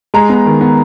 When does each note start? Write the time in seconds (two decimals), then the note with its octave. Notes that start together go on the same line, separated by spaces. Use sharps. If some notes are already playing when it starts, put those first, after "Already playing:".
0.14 G#3 A#5
0.29 B3
0.46 D#3
0.61 B3